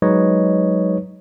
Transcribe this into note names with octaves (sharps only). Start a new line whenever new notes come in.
F#3 G#3 D#4 B4 C#5 D#5